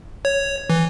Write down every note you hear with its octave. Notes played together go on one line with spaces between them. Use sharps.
C#5
E3